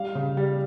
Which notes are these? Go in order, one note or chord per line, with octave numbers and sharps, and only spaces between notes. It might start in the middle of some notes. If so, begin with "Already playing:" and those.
Already playing: G3 F5
C#3
G3